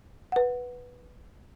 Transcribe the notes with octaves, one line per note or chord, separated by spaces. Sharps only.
B4 F#5